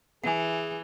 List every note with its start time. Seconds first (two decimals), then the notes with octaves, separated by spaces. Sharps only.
0.24 E3 G#4 F#5 G#5